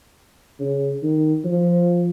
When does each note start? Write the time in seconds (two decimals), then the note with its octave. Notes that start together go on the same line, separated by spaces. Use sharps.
0.59 C#3
1.03 D#3
1.44 F3